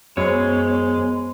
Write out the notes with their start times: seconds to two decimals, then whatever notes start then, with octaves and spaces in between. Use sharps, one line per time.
0.17 F#2 F#3 G#3 B3 C5 C#5